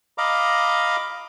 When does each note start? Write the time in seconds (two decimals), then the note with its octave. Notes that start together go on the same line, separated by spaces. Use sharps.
0.18 D#5 F5 A#5 B5 D6